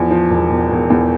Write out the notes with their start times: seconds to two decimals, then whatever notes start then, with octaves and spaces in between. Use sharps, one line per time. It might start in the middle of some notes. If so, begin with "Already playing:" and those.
Already playing: E2 F3
0.11 F3
0.30 E1
0.50 E1
0.71 E1
0.90 E2